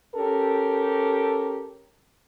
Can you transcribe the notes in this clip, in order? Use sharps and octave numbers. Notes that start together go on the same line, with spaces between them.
C#4 G4 A4 A#4